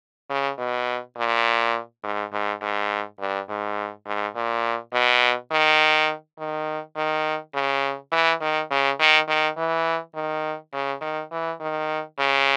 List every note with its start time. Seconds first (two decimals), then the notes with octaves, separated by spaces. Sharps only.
0.30 C#3
0.59 B2
1.17 A#2
2.04 G#2
2.33 G#2
2.62 G#2
3.20 G2
3.49 G#2
4.07 G#2
4.36 A#2
4.93 B2
5.51 D#3
6.39 D#3
6.97 D#3
7.54 C#3
8.12 E3
8.41 D#3
8.71 C#3
8.99 D#3
9.28 D#3
9.57 E3
10.15 D#3
10.73 C#3
11.02 D#3
11.32 E3
11.61 D#3
12.19 C#3